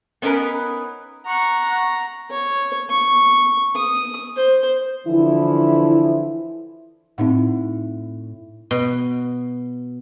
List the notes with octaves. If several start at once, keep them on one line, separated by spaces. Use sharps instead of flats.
B3 C#4 D#4 A#4 B4
F#5 A#5 C#6
C#5
C#6
D#6
C5
D3 E3 F3 E4
A2 C4 D#4 F#5
B2